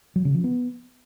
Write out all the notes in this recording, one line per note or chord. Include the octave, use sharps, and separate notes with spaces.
F#3
C#3
F3
B3